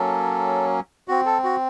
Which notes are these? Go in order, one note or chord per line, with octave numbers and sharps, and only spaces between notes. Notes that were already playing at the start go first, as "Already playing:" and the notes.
Already playing: F#3 A#3 C#4 A4
C4 F#4
A4
F#4